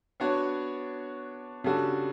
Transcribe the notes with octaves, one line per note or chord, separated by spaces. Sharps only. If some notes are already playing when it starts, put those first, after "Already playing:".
B3 D4 F#4 C#5
C#3 G3 D4 F#4 A4